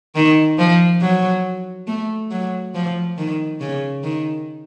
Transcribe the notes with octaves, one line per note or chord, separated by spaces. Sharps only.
D#3
F3
F#3
A3
F#3
F3
D#3
C#3
D#3